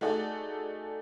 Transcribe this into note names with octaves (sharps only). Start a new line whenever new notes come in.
A3 D#4 F#4 G#4 A4 D5